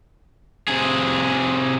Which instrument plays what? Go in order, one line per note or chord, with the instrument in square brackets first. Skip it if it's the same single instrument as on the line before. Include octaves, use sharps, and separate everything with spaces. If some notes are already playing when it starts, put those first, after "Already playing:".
[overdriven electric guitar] C3 G#4